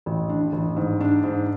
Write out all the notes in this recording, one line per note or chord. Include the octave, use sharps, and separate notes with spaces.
A1
D4
A1
G#2
D4
G#2